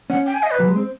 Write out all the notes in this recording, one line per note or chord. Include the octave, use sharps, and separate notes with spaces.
C#4 F#5
G5
G#5
D#5
B4
F#3
G#3
C4